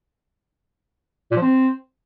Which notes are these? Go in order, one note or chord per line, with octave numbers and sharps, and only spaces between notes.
A#2
F3
C4